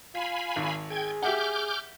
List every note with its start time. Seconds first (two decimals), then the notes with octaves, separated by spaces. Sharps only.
0.15 F4 F5 G#5 B5
0.56 G#1
0.90 G#4 G5 G#6
1.22 G4 E5 F#5 D6 F6 G6